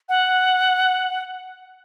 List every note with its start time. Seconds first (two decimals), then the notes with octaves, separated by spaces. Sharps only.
0.09 F#5